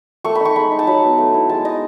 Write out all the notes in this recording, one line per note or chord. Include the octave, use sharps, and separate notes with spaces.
A3 C#6
D#4 B5
C#6
G#3 B5
D#4
A5
F#3 B5
B3 D#4
A3
E4
G#3 A5
D#4 D#5